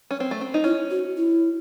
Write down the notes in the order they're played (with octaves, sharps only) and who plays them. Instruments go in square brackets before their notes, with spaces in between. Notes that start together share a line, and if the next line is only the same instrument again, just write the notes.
[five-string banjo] C#4
C4
A3
C4
D#4
[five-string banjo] C#4 [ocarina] E4
[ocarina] F#4
E4